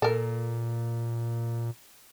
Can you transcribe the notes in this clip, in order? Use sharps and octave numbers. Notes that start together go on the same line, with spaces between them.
A#2 A4 A#4